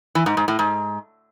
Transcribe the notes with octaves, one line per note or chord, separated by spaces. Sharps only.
E3
G#2
G#2
A2
G#2